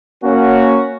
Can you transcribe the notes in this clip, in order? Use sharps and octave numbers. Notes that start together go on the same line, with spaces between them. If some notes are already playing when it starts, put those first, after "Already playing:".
A#3 C#4 F#4